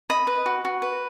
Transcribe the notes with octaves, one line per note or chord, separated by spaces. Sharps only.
D#5 B5
B4
F#4
F#4
B4